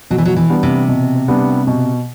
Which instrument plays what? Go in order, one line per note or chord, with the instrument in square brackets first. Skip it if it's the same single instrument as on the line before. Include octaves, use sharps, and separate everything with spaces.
[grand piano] B2 [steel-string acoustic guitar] F#3
[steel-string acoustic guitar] E3
F#3
E3
[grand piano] G3 B3 D4
[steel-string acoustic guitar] C3
[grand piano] B2
G3 B3 D4
B2